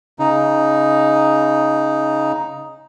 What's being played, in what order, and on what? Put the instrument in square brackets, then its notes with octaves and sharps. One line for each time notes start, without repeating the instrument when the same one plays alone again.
[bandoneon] C#3 D#4